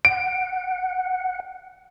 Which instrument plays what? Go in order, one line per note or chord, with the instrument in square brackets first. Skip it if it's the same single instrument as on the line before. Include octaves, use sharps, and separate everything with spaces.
[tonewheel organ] F#5 [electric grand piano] D7